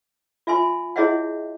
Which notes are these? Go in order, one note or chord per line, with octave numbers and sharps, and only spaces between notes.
F4 E5 G#5 C6
E4 G#4 C#5 D#5 E5 F#5